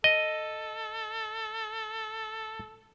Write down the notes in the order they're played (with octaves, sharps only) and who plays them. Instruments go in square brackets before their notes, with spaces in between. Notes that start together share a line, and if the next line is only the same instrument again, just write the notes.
[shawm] A4 [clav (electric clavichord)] D#5